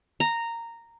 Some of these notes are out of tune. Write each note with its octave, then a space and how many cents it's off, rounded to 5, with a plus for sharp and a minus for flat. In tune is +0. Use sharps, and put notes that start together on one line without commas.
A#5 -10